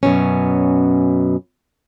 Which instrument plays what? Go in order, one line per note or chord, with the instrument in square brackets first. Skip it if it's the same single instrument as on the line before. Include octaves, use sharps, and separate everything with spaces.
[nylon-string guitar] F#2 B2 C#4